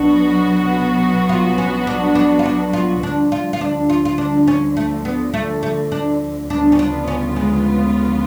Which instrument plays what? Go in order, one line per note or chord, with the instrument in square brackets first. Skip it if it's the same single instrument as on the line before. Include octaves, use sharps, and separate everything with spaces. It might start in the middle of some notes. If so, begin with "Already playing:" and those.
Already playing: [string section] B1 B2 F#3 B3 F#4 [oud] D4
[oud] F4
C#4
D4
D4
F4
D4
F4
[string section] D2 D3 F3 [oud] D4
[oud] F4
F4
D4
F4
F4
D4
C#4
A3
B3
A3
A3
D4
[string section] D2 C#3 F3 B3 F4 [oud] D4
[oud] C#4
D4
C#4
G#3